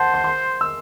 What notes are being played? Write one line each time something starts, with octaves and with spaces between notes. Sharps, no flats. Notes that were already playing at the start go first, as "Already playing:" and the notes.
Already playing: C5 F#5 A5
C6
C6
E6